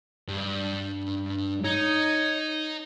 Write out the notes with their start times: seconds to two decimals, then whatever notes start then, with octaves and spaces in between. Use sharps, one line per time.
0.29 G2
1.64 D#4 C#5